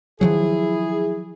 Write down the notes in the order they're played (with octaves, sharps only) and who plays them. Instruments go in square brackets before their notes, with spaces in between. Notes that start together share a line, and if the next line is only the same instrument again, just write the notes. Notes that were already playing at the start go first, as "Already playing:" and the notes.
[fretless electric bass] D#3 F3 F#3 [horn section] E4 G#4